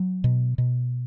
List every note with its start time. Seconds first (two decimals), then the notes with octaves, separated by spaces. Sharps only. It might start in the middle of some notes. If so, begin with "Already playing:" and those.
Already playing: F#3
0.24 B2
0.58 B2